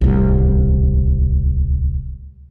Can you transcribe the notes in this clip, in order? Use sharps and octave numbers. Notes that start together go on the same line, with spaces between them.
D1 C2